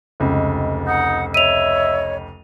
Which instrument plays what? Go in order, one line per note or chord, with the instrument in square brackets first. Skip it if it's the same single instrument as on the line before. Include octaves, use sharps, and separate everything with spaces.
[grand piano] F1 C#2
[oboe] D#4 [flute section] F#5
[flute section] C#5 D#5 [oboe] E5 [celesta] D#7 F7